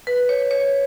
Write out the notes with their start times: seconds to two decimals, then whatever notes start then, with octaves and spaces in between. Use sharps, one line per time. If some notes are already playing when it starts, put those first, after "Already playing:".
0.07 B4
0.29 C#5
0.51 C#5